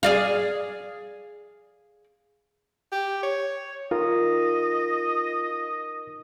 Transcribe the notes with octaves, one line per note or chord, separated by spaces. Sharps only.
G#4 D5 F5
G4
C#5
D#4 F4 A#4 D#5